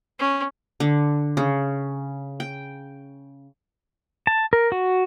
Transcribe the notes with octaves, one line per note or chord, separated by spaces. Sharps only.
C#4
D3
C#3
G5
A5
A#4
F#4